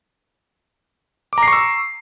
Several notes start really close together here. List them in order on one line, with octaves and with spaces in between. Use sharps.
D6 A#5 C7 C#6 E6